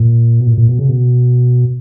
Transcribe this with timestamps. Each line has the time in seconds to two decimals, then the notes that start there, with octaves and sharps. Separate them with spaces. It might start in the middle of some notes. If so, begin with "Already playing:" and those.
Already playing: A#2
0.40 B2
0.47 A#2
0.58 A#2
0.69 B2
0.79 C#3
0.89 B2